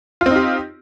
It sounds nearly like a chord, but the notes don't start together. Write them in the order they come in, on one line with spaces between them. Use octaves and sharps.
F4 C4 D#4 G4